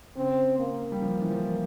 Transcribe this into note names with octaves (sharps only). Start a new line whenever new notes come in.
C#3 C4
A#3
G3
F3
E3
F3